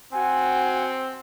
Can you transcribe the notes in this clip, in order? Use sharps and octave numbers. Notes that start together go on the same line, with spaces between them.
C4 F#4 F#5 G#5